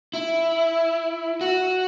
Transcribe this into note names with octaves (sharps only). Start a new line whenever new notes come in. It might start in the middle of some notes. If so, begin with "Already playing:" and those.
E4
F#4